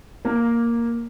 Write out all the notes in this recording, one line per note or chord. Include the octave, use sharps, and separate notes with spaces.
A#3